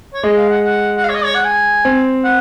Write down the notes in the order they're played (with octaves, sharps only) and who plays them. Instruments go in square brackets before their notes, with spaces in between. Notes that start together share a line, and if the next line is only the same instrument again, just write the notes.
[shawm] C#5
[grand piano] G#3 [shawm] D#5
[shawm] F5
F#5
F#5
F#5
F5
C#5
D#5
C#5
F#5
G#5
[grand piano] C4
[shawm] F#5